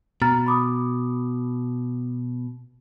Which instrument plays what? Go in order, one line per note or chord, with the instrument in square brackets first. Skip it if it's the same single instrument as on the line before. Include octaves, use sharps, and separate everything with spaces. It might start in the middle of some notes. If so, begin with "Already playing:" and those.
[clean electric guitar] B2 [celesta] A#5 F6 A6
[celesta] B5 D6 D#6